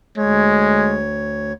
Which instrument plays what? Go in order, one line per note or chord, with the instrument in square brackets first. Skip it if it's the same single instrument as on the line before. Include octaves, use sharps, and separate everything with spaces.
[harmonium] D2 C#5 [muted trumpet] G#3